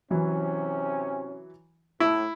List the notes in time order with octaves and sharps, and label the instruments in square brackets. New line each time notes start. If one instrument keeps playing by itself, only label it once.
[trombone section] C3 C#4 [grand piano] E3 F#3 E4
[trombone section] A2 [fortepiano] E4